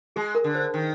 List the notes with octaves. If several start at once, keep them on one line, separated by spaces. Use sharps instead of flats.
G#3 G#4
A#4
D3
C5
D#3